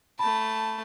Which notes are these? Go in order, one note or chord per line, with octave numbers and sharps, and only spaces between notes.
A3 A5 B5